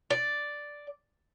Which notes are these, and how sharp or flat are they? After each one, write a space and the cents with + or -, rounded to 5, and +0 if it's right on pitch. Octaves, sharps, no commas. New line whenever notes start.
D5 +0